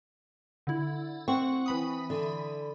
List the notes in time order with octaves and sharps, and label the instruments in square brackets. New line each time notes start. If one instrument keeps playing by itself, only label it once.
[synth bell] D3 E4
[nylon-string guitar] C4 [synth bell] F#5 C#6
[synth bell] E3 B5 D#6
[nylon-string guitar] D3